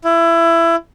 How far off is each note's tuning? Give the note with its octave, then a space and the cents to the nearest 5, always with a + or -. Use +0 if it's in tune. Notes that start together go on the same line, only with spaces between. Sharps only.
E4 +20